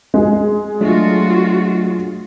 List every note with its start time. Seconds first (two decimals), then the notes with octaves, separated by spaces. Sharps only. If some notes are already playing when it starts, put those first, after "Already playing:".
0.14 G#3 G#4
0.81 F#3 A3 D4 F4 F#4